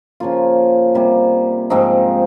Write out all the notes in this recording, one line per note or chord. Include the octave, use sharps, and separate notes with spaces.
C#3 F3 A#3 F4
C3 G3 A#3
G#2 F3 C4 D#4